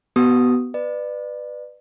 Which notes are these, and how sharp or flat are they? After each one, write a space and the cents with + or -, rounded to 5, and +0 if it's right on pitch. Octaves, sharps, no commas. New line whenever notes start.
B3 +0 F#4 +45 D#6 +0
B4 +10 D5 +30